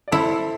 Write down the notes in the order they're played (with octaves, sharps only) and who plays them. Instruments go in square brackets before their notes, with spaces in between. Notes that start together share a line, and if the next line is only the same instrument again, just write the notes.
[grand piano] D5
[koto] E4 [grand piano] A4 C5